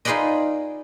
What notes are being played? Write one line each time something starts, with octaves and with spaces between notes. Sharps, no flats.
D#4 F4 G#4 B4 D5 D#5